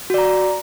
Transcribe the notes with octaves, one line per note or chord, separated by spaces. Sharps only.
F#4 D5 A#5